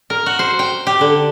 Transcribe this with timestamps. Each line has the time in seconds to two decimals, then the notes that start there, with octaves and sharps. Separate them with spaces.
0.10 A#4
0.26 F#4
0.39 C5
0.59 G5
0.87 G4
1.01 D3